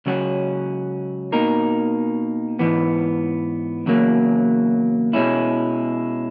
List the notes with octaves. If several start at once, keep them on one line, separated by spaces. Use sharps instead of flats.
C#2 C#3 F#3 C#4 F#4
B2 A#3 D#4 A#4
G#2 E3 B3
E2 C#3 F#3 A#3
B2 G#3 C#4 E4